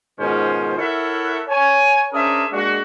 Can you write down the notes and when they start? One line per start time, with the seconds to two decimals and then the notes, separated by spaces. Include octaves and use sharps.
0.20 G#2 B2 D#3 C#4 F4 C5
0.78 E4 A4 A#4 C#5 E5 F#5
1.49 C#5 G#5
2.13 C#4 D4 G#4 A#4 C5 E5
2.52 G#3 A#3 D4 F#4